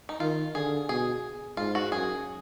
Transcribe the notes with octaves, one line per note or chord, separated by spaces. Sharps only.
D#4
D#3 F4
D3 G#4
B2 G#4
G#2 F4
F#4
F#2 G#4